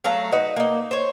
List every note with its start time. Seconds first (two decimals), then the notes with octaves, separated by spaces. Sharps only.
0.04 F#3 A3 F5 A#5
0.32 D#4 F#4 B4
0.56 A#3 D#4
0.91 C5 C#5